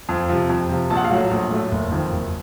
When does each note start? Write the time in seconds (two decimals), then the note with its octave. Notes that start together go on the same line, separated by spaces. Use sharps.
0.09 F2
0.29 C3 F3
0.50 F2
0.69 C3 F3
0.90 A#1 A5
0.97 F#5
1.05 F5
1.10 A2 F#3 A3 F#5
1.31 A#1
1.51 A2 F#3 A3
1.71 F#1
1.92 F2 D#3
2.12 F#1